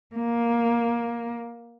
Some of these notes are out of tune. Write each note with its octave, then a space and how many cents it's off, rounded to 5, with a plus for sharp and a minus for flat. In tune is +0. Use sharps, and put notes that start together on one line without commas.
A#3 +10